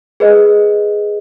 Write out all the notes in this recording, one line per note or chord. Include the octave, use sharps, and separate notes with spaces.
G#4 B4 D#5